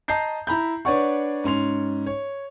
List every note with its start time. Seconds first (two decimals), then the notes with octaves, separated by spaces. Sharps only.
0.08 D#5 A5 A#5 G6 C7
0.47 E4 A#5 B5 G6
0.85 D4 B4 C#5 D5 F#5 C#6
1.44 G#2 C#4 C6 F7
2.06 C#5